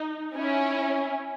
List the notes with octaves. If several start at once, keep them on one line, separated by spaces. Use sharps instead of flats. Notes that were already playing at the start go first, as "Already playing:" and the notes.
Already playing: D#4
C#4 E4